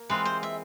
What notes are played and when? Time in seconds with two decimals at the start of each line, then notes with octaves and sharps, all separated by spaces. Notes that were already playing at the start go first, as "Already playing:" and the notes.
Already playing: A#3
0.09 E3 G#3 C4 F4 B4
0.25 C5
0.43 E5